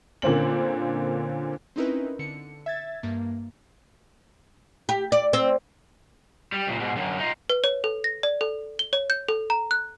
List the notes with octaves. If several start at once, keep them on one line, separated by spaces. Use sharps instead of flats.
A#2 D3 A#3 C4 C#4 F#7
C4 C#4 D#4 E4 A#4 B4
D3 C#7
E5 G#6 A6
G2 A#3
G4
D5
C4
G3
C#2 A#2
G#2 B2
F#2 D3
D#4 F4
B4
C#5
A4
A#6
D5
A4
G7
C#5
G6
A4
A#5
F#6